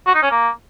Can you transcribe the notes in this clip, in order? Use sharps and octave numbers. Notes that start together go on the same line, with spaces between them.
F#4
D#4
C#4
A#3